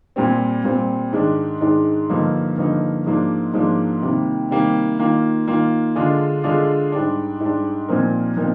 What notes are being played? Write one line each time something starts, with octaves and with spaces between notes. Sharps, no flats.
A#2 G3 C4
A#2 G3 C4
G#2 D#3 G#3 D4
G#2 D#3 G#3 D4
G2 D3 F3 A#3 D#4
G2 D3 F3 A#3 D#4
G#2 F3 A#3 D4
G#2 F3 A#3 D4
C3 D#3 G3 A#3
C3 D#3 G3 A#3
D#3 A#3 F4
D#3 A#3 F4
D3 G#3 D4 F4 G#4
D3 G#3 D4 F4 G#4
G#2 G3 D4
G#2 G3 D4
A#2 F3 C4 D#4 A#4
A#2 F3 C4 D#4 A#4